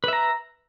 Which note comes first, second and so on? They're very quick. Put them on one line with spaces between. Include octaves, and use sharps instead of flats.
B4 E5 A#5